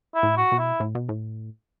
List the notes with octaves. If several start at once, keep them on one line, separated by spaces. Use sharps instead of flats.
E4
A2
F#4
B2
E4
A2
B2
A2